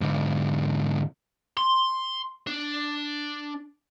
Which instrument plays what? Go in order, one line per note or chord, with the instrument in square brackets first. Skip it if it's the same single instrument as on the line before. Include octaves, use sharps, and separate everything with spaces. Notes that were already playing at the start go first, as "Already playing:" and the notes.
[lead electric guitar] G#2 D3
[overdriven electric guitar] C6
D4